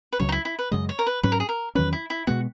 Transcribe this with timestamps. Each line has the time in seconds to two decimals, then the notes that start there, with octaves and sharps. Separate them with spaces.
0.13 B4
0.19 C#2 C#3 F#3 C#4 C#5
0.29 D#4
0.32 E4
0.45 E4
0.59 B4
0.71 F#2 C#3 G#3 D#5
0.89 C#5
0.99 A#4
1.06 B4
1.23 G#2 F#3 C#4 B4
1.32 A#4
1.40 G#4
1.49 A#4
1.75 E2 D#3 F#3 C#4 B4
1.93 E4
2.10 E4
2.27 B2 G#3 B3 F#4